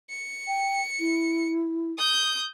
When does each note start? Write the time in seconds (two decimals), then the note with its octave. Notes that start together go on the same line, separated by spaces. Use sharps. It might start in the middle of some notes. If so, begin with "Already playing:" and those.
0.10 C#7
0.48 G5
1.00 E4
1.98 D#6 G6